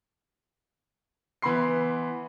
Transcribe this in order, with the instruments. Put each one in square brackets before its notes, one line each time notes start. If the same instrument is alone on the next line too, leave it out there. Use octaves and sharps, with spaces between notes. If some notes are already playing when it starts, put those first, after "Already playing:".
[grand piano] E3 B3 B5 C6 C7